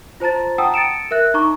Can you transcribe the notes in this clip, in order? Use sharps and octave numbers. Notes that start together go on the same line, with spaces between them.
F4 C5 A5 A#5 A6
F#5 G5 A5 A#5 D#6 E6
A6 C#7 D7 E7
A#4 E5 F#6
D#4 A#5 C#6 D6